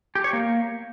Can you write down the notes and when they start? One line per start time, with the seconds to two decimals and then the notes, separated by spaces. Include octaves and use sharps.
0.15 G4
0.24 C#5
0.33 A#3